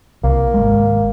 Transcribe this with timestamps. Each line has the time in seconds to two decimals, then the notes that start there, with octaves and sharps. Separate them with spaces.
0.24 C2 A#3
0.54 G#1 G#3